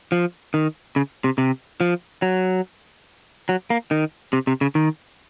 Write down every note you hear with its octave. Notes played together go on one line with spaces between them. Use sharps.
F3
D#3
C#3
C3
C3
F3
F#3
F#3
A#3
D#3
C3
C3
C#3
D#3